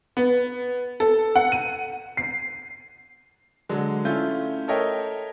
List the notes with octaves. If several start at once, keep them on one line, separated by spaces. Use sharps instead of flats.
B3
A4
F#5
D#7
C7
D3 F#3 G#3
A3 C#4 E4 F4 G6
A4 A#4 C#5 D#5 E5 G5